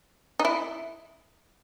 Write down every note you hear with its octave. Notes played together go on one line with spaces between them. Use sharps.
D#4
E4